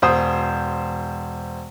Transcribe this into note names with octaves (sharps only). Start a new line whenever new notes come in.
E1 C5 D#6